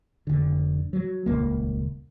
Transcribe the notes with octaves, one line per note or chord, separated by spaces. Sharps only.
F1 D3
F#3
D#1 C#2 A#3